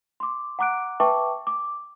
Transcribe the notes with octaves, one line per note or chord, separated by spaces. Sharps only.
C6 D6
F#5 A#5 D6 F#6 D7
B4 E5 G5 A5 C#6 D6
D6